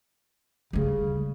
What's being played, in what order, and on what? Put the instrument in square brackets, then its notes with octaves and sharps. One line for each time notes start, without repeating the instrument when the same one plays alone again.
[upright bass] D2 G3 [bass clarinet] C#3